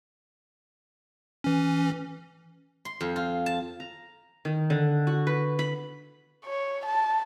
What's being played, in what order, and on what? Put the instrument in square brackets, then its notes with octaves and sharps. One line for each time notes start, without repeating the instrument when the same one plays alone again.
[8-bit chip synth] E3 C#4
[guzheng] C6
F2
F4
A5
[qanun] A#5
D#3
D3
F#4
B4
B5
[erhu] C#5
A5